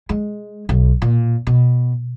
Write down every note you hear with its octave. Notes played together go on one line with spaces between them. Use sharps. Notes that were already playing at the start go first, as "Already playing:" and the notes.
G#3
B1
A#2
B2